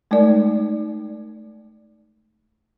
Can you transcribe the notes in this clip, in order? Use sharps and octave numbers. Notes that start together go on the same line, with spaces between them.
G#3 A3 D#4 A#4 D5